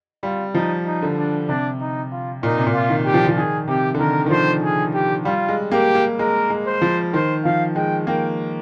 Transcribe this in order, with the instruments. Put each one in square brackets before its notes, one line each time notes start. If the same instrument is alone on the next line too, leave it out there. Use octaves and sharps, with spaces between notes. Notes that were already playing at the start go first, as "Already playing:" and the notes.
[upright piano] G3 [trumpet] F4
[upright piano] F3 [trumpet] D#4
[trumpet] D#4
[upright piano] D3
[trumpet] D4
[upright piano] C3 [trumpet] D4
[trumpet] D#4
F4
[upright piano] A#2 [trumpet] D#4
[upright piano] C3
A#2
[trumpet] F4
[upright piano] D#3
[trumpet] G4
[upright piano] F3
F3
[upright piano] D#3 [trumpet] G#4
[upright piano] C3 [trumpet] G4
[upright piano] D3
[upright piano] D#3 [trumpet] A#4
[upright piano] D#3
[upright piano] F3 [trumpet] C5
[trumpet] G#4
G4
[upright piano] G3 [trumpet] F4
[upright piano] G#3
[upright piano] A#3 [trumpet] G4
[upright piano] A#3
[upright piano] G#3 [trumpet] A#4
[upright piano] G#3
[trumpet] C5
[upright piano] F3
[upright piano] D#3 [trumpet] C5
[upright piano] F3 [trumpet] F5
[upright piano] G#3 [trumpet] G5
[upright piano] A#3 [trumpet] G5